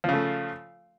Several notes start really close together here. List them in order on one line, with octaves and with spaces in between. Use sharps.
F3 C#3 A3